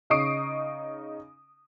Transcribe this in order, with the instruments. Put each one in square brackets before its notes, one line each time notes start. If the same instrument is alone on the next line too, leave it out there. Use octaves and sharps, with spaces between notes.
[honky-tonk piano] C#3 D#4 C#6 D#6 C7 D7